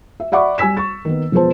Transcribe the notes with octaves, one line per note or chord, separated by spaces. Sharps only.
E5
D5 E5 F#5 B5 C#6 D6
G3 G#5 E6 B6 E7
C#6 A6
D#3 A#3 B3
E1 F3 G#4 B4 C5 A5